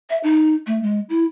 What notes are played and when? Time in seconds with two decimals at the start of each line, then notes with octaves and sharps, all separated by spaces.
0.10 E5
0.24 D#4
0.67 A3
0.83 G#3
1.09 E4